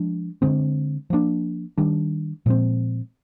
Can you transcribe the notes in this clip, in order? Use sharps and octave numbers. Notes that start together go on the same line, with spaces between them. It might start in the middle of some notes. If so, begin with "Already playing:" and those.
Already playing: F3 G#3 D4
D3 G#3 C4
F3 A#3 D4
D#3 G3 D4
A#2 F3 G#3 C4